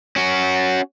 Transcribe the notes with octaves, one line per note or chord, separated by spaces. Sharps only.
C#4 F#4